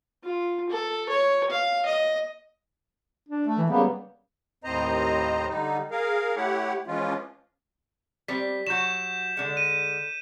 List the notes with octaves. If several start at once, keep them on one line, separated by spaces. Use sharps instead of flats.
F4
A4
C#5
F5
D#5
D4
A3
E3
C#3 G3 A#3 B3
D#2 A2 C4 C5 D#5 A#5
D3 G3 D#4
G#4 A#4 F5
A3 E4 G4 C#5 F#5
E3 F3 G#3 C#4 F4
G3 C4 B6
F#3 F#4 G6 E7
D3 G#3
D#7